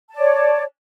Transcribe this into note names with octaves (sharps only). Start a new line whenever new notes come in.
C#5 D5 A5